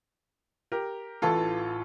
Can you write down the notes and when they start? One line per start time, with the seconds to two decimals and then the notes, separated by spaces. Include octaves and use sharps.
0.72 G4 A#4
1.22 A1 A2 E3 F4 A4